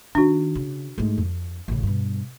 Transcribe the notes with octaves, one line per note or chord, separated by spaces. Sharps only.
D#3 D4 F#4
C#3
G#2 A3
F2
A1 C#3
G2 B2